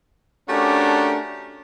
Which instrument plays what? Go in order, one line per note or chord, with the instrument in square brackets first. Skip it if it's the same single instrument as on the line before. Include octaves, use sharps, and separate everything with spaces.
[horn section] A3 C#4 D4 F#4 G4 A#4